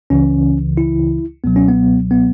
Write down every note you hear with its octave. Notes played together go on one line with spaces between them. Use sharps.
C#2 C#3 E3 C#4
E4
C#2 B2 F#3 B3
C#4
B3
B3